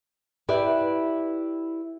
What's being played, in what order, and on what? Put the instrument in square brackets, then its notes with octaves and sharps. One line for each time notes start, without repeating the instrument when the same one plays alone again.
[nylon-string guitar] E4 G4 B4 D5 E5